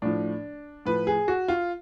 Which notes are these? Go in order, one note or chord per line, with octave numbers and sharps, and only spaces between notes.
A2 F3 D4
A2 F3 B4
G#4
F#4
F4